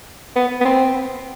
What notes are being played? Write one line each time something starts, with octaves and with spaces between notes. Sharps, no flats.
B3
B3
C4